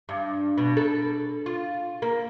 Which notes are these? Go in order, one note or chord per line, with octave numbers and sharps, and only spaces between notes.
G2
B2
A4
F4
A#3